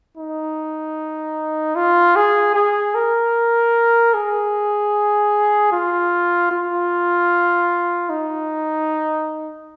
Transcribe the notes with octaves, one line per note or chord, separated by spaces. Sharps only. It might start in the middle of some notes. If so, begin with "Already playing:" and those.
D#4
F4
G#4
G#4
A#4
G#4
F4
F4
D#4